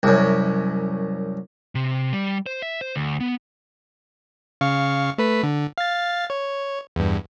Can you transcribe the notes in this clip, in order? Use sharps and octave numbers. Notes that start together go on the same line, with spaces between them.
C2 F#2
C3
G3
C5
E5
C5
D2
B3
C#3 F5 C#6
A3 B4 B6
D3
F5 A6
C#5
E2 G2